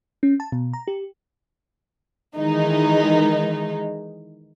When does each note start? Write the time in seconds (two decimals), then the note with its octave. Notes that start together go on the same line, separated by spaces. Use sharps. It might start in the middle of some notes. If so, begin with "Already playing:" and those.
0.23 C#4
0.40 A5
0.52 B2
0.74 A#5
0.88 G4
2.37 D#3 E3 G#3 D#4